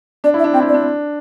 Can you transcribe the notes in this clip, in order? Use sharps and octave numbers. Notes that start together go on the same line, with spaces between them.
D4 D5
E4
E5
D4
C4 G5
E4
D4
D5
D4